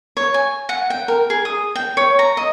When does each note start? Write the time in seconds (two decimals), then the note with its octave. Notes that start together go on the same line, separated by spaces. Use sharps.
0.17 C#5
0.34 G#5
0.69 F#5
0.90 G5
1.08 A#4
1.30 G#4
1.45 D#6
1.75 G5
1.97 C#5
2.19 A#5
2.37 D#5